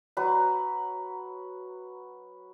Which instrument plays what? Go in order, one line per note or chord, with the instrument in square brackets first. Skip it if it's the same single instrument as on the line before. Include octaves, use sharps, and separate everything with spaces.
[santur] F#3 B4 A#5